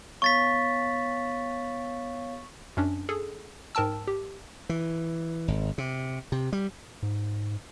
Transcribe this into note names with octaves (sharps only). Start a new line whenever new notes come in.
B3 C#5 F5 C#6 A6 B6
F#2 C#4 D4
G#4 A4
G#2 A#4 G5 A5 E6
G4
E3
G#1
C3
C3
G3
G#2